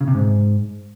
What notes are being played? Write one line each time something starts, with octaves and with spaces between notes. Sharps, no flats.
C#3
C3
G#2